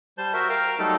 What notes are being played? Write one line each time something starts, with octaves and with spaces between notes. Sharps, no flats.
G3 C5 A5 G6
F#4 A#4 C5 E5
A#4 F5 G5 A#5
F#3 G3 A3 D#4 A4